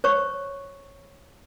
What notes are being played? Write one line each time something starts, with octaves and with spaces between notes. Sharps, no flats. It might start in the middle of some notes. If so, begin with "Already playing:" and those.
C5 C#5 C#6